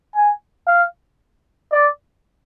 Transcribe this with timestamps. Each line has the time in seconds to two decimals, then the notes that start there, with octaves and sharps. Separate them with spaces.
0.15 G#5
0.67 F5
1.72 D5